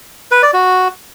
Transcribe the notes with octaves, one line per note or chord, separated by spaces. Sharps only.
B4
D5
F#4